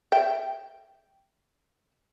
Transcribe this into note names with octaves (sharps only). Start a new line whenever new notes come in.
E5 G5